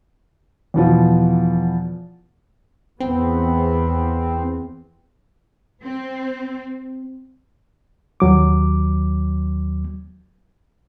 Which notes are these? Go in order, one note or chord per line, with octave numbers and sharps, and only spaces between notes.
E2 B2 F3
E2 B3 C4
C4
D#2 F#3 D6